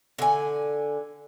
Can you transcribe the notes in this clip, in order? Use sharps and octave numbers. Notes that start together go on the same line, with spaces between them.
D3 G#5